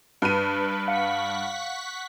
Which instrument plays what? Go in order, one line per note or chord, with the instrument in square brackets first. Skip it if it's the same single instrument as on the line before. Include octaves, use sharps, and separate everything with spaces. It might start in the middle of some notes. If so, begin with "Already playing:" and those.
[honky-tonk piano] G2 D#7 [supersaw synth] B4
[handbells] F5 [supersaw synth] F#5 C#6 B6